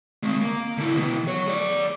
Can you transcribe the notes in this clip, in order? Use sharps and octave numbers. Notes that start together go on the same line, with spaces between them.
G#3 C4
A#3
D3 E4
B2 E3
F#3 C#5
G#4 D5